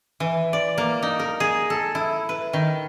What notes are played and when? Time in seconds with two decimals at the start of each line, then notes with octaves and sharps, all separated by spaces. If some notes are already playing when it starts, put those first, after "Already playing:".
0.20 E3
0.53 D5
0.78 A#3
1.02 D#4
1.20 A#4
1.40 G#4
1.70 A4
1.95 E4
2.29 B4
2.53 D#3